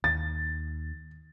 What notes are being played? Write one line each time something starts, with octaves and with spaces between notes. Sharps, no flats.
D#2 A6